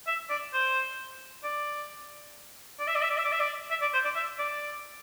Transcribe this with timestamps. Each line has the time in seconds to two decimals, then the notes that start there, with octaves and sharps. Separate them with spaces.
0.07 E5
0.30 D5
0.53 C5
1.44 D5
2.80 D5
2.88 E5
2.95 D5
3.02 E5
3.10 D5
3.17 E5
3.25 D5
3.32 E5
3.40 D5
3.71 E5
3.82 D5
3.93 C5
4.05 D5
4.16 E5
4.39 D5